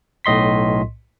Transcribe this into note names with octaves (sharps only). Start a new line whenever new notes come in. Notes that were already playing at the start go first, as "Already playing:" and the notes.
B1 A2 D#5 C6 B6